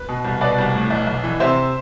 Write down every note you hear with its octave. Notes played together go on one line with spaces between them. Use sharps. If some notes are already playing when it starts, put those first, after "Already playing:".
Already playing: B4
B2
C2
B2 B4 D5
C2
A2
B1
B1
E3
C3 C5 E5